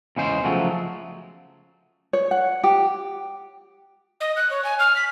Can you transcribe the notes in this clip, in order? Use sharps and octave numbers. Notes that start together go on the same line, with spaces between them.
E2 C#3 G#3 C5
C#3 F3 F#3 A3
C#5
F#5
G4
D#5
F#6
C#5
G#5
F6
B6